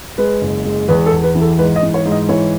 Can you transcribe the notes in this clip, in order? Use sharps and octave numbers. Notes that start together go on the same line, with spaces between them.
G#3 B4
F#1
G#3
E2 B4
A4
E2
B4
E3
A4
G#2 B4
D#5
E3
C#5
G#2
D#5
E3 C#5